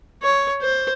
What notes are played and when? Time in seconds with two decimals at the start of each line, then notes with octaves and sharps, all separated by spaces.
0.23 C#5
0.62 C5